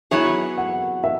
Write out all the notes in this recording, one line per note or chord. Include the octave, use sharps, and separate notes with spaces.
F#3 B3 E4 G#4 C#5 E5
F#5
E5